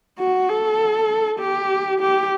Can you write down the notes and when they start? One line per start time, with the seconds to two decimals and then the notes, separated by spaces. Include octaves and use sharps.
0.19 F#4
0.49 A4
1.39 G4
2.01 G4